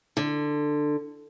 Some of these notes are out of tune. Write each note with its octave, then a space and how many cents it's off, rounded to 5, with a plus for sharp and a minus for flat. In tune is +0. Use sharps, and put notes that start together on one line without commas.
D3 +15